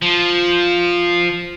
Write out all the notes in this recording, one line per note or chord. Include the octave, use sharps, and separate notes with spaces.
F3